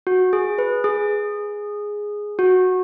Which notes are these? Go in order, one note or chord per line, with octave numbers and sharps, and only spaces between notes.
F#4
G#4
B4
G#4
F#4